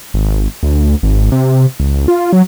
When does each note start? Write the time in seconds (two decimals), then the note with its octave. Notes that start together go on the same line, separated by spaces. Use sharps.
0.14 G#1
0.63 D2
1.03 G#1
1.32 C3
1.80 C#2
2.08 F4
2.33 F#3